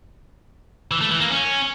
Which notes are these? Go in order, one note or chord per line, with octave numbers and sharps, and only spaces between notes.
E3
A3
E3
A#3
C#4